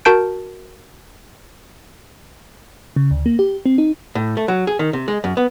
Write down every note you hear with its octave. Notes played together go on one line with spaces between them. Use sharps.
F#4 A#4 A5 G6 D7
C#3
D2
A#3
G4
C4
D#4
A2
A3
F#3
G#4
D#3
C3
G#3
F#2
B3